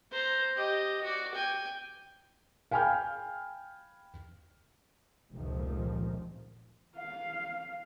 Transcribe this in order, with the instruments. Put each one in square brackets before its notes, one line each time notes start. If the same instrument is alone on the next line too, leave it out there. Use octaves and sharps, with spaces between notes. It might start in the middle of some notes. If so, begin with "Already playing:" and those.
[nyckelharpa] C5 A#5
G4 D#5
F#4 D5
G5 G#5
[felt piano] F5 G5 G#5 B5 F6 G6
[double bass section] F1 C#2 A#2 D#3 F3
[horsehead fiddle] F5